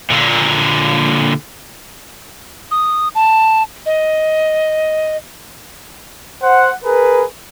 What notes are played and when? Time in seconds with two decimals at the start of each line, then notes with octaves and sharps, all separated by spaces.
0.10 A#2 D3
2.71 D#6
3.15 A5
3.86 D#5
6.42 C5 F#5
6.85 G#4 A#4 B4